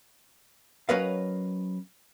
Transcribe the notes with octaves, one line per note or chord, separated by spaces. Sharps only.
F#3 C#4 A#4 B4 D#5 F5